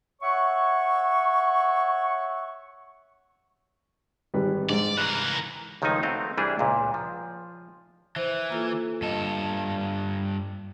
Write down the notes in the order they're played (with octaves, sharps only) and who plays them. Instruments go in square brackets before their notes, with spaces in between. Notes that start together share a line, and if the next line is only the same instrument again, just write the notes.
[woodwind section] C#5 E5 F#5 C#6
[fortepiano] G#1 G3 B4
[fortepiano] G#2 [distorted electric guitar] D5
[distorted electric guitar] E3 A#4 [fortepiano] F#6
[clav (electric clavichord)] C#2 D#3 F3 A3 D#4 G#5
A3 C4 F#4 D#5 F5
C2 E3 G3 D4 E4 G#4
C#2 A#2
F3
[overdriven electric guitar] E3 [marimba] C5
[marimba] A#3 F4 A4
[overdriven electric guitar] G2 A4 [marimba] D#5